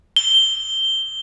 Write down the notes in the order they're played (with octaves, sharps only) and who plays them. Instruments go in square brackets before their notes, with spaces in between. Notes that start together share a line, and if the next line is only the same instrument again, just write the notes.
[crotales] G7